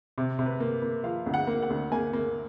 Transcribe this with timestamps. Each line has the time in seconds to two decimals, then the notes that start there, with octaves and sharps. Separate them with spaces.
0.18 C3
0.39 C3
0.46 B4
0.60 A#3
0.82 A#3
1.04 F3 F5
1.26 D2
1.34 F#5
1.47 A#3
1.63 F#5
1.70 D2
1.92 A#3 G#5
2.13 A#3